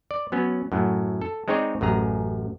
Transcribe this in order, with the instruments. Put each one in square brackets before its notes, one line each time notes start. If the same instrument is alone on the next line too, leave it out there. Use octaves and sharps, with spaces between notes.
[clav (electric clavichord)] D5
F#3 B3 C#4
F#2 A2 F#3
A4
G#3 C4 D#4 G#4 C#5 D5
A1 F#2 G#4 A#5